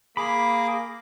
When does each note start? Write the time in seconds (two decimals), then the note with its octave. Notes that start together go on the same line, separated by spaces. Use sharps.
0.17 A#3 G#4 B5 D6